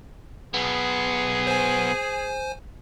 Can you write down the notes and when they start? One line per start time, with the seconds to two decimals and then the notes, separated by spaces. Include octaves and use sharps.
0.54 B1 B3 G#4
1.47 C5 G#5